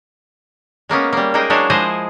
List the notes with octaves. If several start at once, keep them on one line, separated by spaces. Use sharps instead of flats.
G#3 A#3 B3 C#4
G3 A#3
G#3 A#3 D#4 G#4 D#5 G5
F#3 G#3 D4 E4 C5 C#5
F3 G#3 E4 G#4 C5 D#5